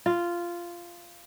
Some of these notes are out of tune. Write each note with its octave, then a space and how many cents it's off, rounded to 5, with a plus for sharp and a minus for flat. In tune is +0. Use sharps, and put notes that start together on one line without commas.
F4 -10